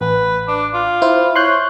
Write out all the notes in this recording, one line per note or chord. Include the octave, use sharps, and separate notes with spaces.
A1 B4
D4
F4
E4 C5
C#5 C6 F#6 G6